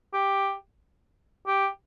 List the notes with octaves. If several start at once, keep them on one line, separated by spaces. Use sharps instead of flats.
G4
G4